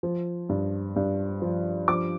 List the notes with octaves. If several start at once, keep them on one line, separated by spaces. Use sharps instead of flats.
F3
G2
G2
F3
F3 D6